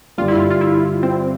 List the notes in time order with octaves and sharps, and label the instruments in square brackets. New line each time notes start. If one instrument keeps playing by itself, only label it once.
[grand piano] G2 D3 G3 [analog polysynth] F4
[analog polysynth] E4
F4
F4
E4
C4